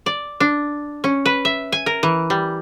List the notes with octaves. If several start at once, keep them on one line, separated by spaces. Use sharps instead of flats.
D5
D4
C#4
B4
E5
G#5
A#4
E3
G3